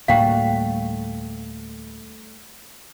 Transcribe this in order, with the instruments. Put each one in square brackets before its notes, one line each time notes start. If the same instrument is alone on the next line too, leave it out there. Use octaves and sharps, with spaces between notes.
[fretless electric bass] D2 A2 A#3 [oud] G3 A3 F#4 [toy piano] F5 G5